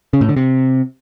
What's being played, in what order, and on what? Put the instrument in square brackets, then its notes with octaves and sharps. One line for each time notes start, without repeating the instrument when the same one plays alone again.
[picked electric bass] C#3
A2
D3
C3